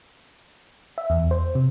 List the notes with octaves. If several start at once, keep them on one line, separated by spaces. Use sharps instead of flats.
E5
E2
C5
C3